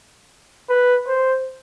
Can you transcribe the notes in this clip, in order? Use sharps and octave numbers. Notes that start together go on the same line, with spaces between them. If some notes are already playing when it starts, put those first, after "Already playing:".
B4
C5